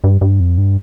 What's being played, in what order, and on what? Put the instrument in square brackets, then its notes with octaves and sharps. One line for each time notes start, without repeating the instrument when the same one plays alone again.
[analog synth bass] G2
G2
F2
G2